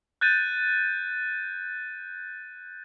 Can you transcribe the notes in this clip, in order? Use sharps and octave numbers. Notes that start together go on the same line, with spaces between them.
F#6 G6 A6 D#7